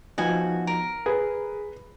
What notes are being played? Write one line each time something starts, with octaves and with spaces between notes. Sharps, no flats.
F3 B3 D#4 F#4 G#5
A#4
G#4 B4